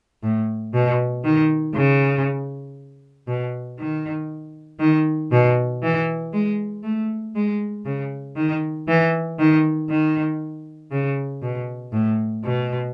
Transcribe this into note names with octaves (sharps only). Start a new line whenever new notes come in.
A2
B2
D#3
C#3
B2
D#3
D#3
B2
E3
G#3
A3
G#3
C#3
D#3
E3
D#3
D#3
C#3
B2
A2
B2